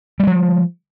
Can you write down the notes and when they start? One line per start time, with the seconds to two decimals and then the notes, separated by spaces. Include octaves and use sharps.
0.20 G3
0.23 G#3
0.27 F3